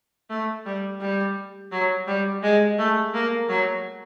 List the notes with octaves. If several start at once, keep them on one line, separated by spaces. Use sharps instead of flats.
A3
G3
G3
F#3
G3
G#3
A3
A#3
F#3